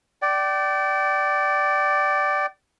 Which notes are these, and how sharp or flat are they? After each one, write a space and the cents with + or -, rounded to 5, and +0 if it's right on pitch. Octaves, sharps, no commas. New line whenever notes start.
D5 +0 G5 -35